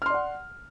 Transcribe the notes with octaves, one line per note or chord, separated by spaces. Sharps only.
D5 F#5 C6 F6